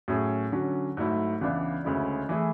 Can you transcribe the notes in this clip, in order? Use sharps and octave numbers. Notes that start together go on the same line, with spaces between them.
A2 F#3 C#4 G#4
D3 F#3 C#4
G#2 F#3 A3 E4
C#2 C#3 E3 B3 D4
D2 C#3 G#3 C#4 E4
E3 A3 E4 G#4